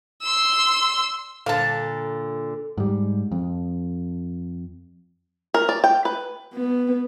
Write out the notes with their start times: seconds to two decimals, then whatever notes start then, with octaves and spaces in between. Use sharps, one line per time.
0.23 C6 E6
1.46 A#2 D3 F5 A5
2.78 G#2 G3
3.32 F2
5.54 A#4
5.69 D5
5.84 G5
6.05 B4
6.53 B3